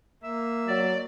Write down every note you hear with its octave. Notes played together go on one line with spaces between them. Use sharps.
A#3 E5
F#3 D5